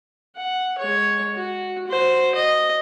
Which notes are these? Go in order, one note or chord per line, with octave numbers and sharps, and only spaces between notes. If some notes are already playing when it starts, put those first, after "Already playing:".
F#5
G#3 C#5
F#4
F#4 C5
D#5